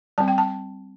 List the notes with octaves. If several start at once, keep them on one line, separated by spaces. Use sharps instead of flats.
G3 C4 A5
G5
A5